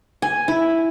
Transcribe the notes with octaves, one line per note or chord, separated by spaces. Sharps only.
G#5
E4